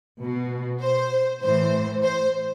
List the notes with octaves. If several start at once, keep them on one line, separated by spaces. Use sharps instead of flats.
B2
C5
A2 E3 C5
C5